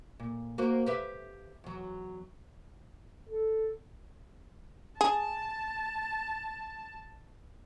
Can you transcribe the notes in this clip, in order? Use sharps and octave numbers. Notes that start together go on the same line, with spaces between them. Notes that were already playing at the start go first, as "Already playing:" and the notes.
A#2
A#3 F#4 C5
G4 B4 E5
E2 F#3
A4
G#4 A5